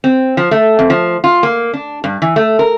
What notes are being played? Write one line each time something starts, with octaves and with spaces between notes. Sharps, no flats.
C4
F3
A3
F2
F3
F4
A#3
D4
G2
E3
A3
A#4